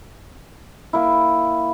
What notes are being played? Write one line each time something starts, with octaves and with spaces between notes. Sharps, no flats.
A#3 E4